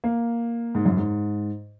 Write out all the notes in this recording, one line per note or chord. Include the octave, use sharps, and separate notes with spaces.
A#3
G#2
F#2
G#2